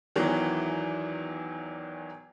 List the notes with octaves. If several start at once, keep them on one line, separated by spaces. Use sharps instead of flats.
E2 D#3 E3 F#3